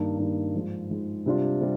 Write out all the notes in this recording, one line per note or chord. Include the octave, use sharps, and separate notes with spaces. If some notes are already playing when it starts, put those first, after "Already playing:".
Already playing: G2 D#3 A#3 D#4
G2 D#3 A#3 D#4
G#2 F3 G#3
G#2 F3 G#3
C3 G3 D4 F4
C3 G3